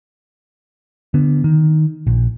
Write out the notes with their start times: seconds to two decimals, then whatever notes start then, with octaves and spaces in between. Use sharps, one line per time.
1.14 D3 B3
1.44 D#3
2.07 A#1